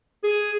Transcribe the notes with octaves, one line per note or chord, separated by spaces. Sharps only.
G#4